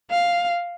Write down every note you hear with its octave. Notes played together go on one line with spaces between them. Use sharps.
F5